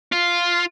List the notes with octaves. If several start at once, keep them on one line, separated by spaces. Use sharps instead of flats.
F4